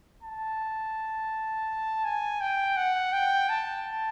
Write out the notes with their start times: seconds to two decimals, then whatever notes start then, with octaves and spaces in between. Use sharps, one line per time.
0.23 A5
2.04 G#5
2.41 G5
2.77 F#5
3.13 G5
3.49 A5